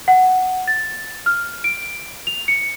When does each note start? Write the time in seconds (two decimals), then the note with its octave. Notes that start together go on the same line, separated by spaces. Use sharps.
0.08 F#5
0.68 A6
1.26 F6
1.64 D7
2.27 F7
2.48 C#7